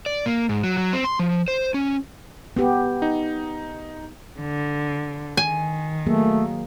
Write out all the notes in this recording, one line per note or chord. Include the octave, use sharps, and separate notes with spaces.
D5
A#3
G#2
F#3
F#3
C4
C6
F3
C5
C#4
B3 G4
D#4
D3
D#3 G#5
F#3 A3 A#3 G#4